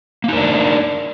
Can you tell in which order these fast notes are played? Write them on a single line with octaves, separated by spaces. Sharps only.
A#3 D#4 A#4 D4